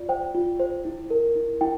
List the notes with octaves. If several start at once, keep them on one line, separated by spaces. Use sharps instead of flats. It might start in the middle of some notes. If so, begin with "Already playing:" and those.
Already playing: F4 D5
C5 G5
F4
C5
E4
A#4
E4
E4 G5